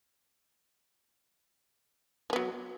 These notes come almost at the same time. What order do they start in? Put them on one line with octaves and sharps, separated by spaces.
F3 B3 F#3